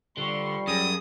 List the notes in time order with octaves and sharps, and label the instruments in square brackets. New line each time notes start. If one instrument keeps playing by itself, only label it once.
[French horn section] G2 F3 G3 [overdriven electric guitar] D3 [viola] C6 C#6
[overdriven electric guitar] F#2 [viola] G#4 [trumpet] D#6